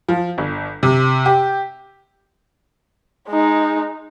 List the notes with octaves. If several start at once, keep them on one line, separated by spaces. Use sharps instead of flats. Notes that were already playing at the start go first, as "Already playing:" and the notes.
F3
G1
C3
G4
G#3 D#4